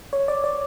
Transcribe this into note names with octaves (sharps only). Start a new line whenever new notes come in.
C#5
D5
D5